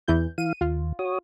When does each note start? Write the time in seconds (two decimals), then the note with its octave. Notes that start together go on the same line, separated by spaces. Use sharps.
0.08 E2 E3 G6
0.38 E3 F5 D#7
0.61 D#2 F4
0.99 F#4 C#5 D#6